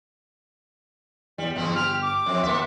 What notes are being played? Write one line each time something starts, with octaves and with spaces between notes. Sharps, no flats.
E2 G3
G1 E2 F3 C4
G4 F6
D6
F2 C4
D#2 A#3 E5